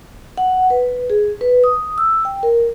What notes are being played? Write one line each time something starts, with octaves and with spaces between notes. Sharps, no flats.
F#5
B4
G#4
B4
D#6
E6
G5
A#4